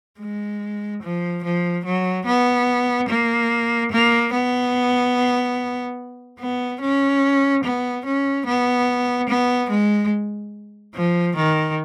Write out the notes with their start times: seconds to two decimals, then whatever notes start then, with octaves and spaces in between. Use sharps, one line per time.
0.19 G#3
1.02 F3
1.44 F3
1.85 F#3
2.26 B3
3.09 A#3
3.92 A#3
4.33 B3
6.39 B3
6.81 C#4
7.64 B3
8.05 C#4
8.46 B3
9.29 B3
9.70 G#3
10.95 F3
11.36 D#3